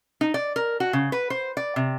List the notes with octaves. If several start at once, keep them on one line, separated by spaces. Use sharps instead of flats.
D#4
D5
A#4
F#4
C#3
B4
C5
D5
C3